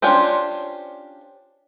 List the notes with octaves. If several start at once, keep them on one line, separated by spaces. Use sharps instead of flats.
C#4 D4 F4 G4 C5